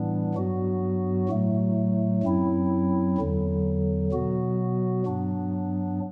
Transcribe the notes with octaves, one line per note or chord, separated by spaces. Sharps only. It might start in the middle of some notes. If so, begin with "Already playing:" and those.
Already playing: A2 E3 G3 B3 D4
G2 F#3 B3 F#4
A2 F#3 A3
F#2 F#3 C4 E4
E2 D3 F#3
B2 F#3 B3 F#4
G2 F#3 B3 D4